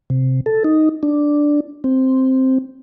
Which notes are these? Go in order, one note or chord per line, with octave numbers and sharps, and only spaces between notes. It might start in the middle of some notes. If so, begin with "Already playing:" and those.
C3
A4
D#4
D4
C4